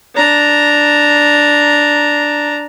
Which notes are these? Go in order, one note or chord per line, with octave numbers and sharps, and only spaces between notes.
D4 A#5